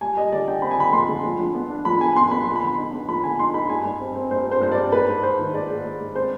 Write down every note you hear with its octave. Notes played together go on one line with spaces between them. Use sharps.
G3 G#5
G3 D#5
D3 D5
D3 G5
C4 B5
G#5
D3 B5
F2 C6
D3
F3
F3
B3
D4
F3 B5
B3 G#5
B3 C6
B3 B5
F3 C6
B5
D3
D#4
B3
F3 B5
D3 G#5
D#4 C6
D#4 B5
G2 G#5
G2
C4
C4
G2 C5
C4 C5
G2 C5
C4 D5
G#2 B4
G#2
G#2 C5
D#3
G#2 D5
G#2
G#2
G#3
C4 C5